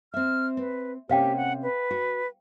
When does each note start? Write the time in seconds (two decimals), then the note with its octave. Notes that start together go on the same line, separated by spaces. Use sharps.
0.14 C4 E5 F6
0.57 C4 B4
1.09 C3 A#3 C#4 G4 C5 F5 G5
1.36 F#5
1.63 B4
1.91 F#4